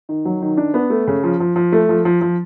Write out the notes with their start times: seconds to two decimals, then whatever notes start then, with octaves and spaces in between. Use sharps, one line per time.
0.09 D#3
0.25 F#3
0.42 D#3
0.57 D4
0.74 B3
0.90 A3
1.08 C#3
1.24 F3
1.40 F3
1.56 F3
1.72 A3
1.89 F3
2.05 F3
2.21 F3